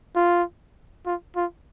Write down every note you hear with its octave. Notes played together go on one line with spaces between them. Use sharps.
F4
F4
F4